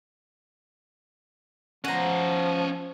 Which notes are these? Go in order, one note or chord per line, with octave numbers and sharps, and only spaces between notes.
F3 C#4 C5 F#5 A#5